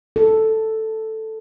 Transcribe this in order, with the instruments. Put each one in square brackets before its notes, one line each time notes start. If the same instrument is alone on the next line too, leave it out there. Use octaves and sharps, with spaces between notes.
[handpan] A4